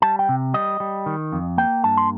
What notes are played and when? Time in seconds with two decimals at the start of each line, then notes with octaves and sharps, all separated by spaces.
0.02 G3 A5
0.19 G5
0.29 C3
0.54 G3 D#5
0.80 G3
1.06 D#3
1.32 F2
1.58 A#3 G5
1.84 G2 A5
1.97 C6